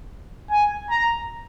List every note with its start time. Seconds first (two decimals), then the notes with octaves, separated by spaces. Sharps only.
0.50 G#5
0.90 A#5